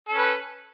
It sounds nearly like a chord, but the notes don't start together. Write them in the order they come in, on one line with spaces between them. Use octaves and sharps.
A4 C#4 B4